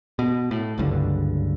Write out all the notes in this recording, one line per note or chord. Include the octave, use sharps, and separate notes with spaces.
B2
A2
F#1 C#2 G2 D3